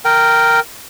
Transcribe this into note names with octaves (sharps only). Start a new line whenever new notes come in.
A#4 G5